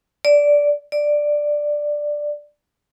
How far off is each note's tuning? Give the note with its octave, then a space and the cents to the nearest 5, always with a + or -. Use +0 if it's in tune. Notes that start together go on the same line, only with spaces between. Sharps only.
D5 -10
D5 +5